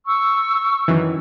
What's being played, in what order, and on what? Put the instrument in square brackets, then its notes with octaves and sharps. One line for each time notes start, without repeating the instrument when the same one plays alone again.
[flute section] C#6 E6
[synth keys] F#2 D#3 E3